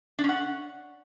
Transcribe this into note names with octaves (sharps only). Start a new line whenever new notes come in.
D4
C#4
F#5